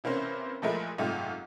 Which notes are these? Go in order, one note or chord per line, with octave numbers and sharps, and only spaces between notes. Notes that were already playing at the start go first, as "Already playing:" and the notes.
C3 E3 A#3 C#4 C5
A#2 F3 G#3 A3 E4 A#4
F#1 G#2 C3 A3 F4 G4